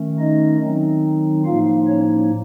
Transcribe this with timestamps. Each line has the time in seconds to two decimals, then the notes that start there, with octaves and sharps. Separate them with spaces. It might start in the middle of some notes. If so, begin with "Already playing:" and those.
Already playing: D#3 A3 C#4
0.19 D#4 D#5
0.61 D#3 F#3 C4 D#4
1.45 A2 F3 A#3 D#4 F4 F5
1.88 C#4 C#5